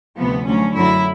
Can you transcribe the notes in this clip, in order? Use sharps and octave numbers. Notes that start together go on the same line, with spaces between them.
D2 C3 F3 B3
D2 D3 F#3 C#4
F#2 D3 F#3 E4